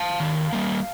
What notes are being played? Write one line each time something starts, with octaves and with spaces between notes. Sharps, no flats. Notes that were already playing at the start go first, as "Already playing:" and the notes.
Already playing: F5 A5
D#3
G3 A#3